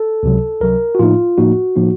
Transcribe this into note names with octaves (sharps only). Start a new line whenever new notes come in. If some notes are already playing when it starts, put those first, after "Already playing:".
Already playing: A4
C#2 C3 F#3
C#2 C3 F#3 A#4
F#4
A2 F3 A#3 D#4 F4
A2 F3 A#3 D#4 F#4
A2 F3 A#3 D#4